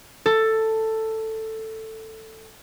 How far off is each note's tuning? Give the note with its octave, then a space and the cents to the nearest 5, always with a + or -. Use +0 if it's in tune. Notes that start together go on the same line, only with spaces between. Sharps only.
A4 +10